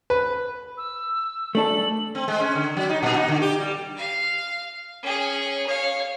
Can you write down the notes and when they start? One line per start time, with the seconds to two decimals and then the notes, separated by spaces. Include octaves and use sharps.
0.10 B4
0.78 E6
1.55 A3 D4 A4 F#7
2.15 C4
2.28 G#3
2.40 C#4
2.55 D3
2.77 F#3
2.89 D#4
3.03 A#2
3.16 D#4
3.28 D3
3.42 G4
3.60 G3
3.97 F5
5.03 C#4 G#4
5.67 C#5 F5